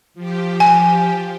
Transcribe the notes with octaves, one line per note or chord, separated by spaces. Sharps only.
F3 G4
G#5